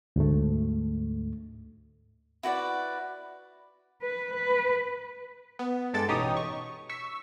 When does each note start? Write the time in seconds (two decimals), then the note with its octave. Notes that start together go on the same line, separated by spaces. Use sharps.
0.16 D2 G#2 A3
2.43 E4 F#4 B4 D5
4.02 B4
4.34 B4
5.59 B3
5.94 G2 G#3 A4 D6 E6 A6
6.08 A1 B2 D#4 G4 C#5 D#6
6.37 C#6
6.89 C#6 E6 B6